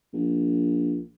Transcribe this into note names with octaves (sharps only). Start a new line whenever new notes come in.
A#1